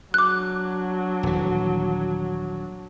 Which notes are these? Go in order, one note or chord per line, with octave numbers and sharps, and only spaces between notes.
F#3 D4 D6 F#6
D#1 E3